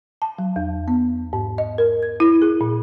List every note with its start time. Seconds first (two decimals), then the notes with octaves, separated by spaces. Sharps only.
0.22 A5
0.39 F#3
0.56 E2
0.88 B3
1.33 G#2
1.58 D#5
1.78 A#4
2.03 G#6
2.20 E4
2.42 G#4
2.61 A#2